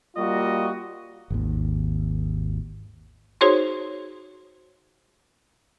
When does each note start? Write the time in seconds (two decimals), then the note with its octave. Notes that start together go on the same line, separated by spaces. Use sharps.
0.16 G3 A#3 F4 F#4 D#5
1.30 G#1 D#2
3.41 D#4 F#4 G#4 C5 C#5 C6